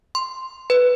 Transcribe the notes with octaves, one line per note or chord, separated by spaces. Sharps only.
C6
B4